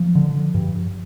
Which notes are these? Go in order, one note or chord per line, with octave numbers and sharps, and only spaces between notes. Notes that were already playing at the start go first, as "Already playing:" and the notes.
Already playing: F3
D3
G2